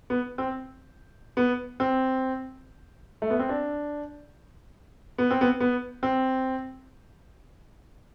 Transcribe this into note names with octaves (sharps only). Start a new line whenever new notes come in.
B3
C4
B3
C4
A3
B3
C4
D4
B3
C4
B3
B3
C4